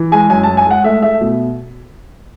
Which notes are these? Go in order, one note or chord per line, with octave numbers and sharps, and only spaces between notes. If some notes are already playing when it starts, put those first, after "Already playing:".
Already playing: E3
G#3 G#5
F#2 G#5
A5
G#3
G#5
G#3 F#5
A3 E5
A3 E5
B2